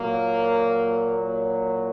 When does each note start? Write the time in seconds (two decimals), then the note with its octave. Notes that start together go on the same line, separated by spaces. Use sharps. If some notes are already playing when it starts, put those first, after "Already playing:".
Already playing: A#2 F#3 A#3